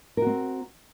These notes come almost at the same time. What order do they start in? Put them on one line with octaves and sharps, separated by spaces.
A#4 F#4 C4